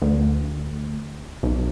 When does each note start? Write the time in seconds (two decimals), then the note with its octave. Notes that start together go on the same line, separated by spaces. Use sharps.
0.02 D2
1.43 B1